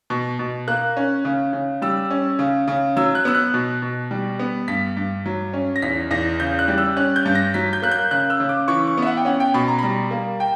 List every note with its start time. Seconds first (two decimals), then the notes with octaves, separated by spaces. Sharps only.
0.10 B2
0.39 B2
0.68 A#3 F#6
0.97 C#4
1.25 C#3
1.53 C#3
1.82 G3 E6
2.11 C#4
2.39 C#3
2.67 C#3
2.97 F#3 E6
3.15 F#6
3.25 B3 E6
3.35 F#6
3.54 B2
3.82 B2
4.11 G3
4.39 B3
4.68 G2 B6
4.97 G2
5.26 F#3
5.53 C#4
5.76 A#6
5.82 E2 B6
6.11 E2 A#6
6.40 C#3 G6
6.59 F#6
6.68 G3
6.78 E6
6.97 C#4 F#6
7.16 G6
7.25 G2
7.35 A#6
7.54 F#3 B6
7.73 G6
7.82 A#3 F#6
7.91 G6
8.11 C#3 F#6
8.30 E6
8.40 C#3
8.49 D6
8.68 E3 C#6
8.87 C#6
8.97 B3 E5
9.07 F#5
9.17 G5
9.25 C#4 F#5
9.40 G5
9.54 B2 B5
9.68 A#5
9.79 B5
9.82 G3 A#5
10.11 A#3
10.40 G5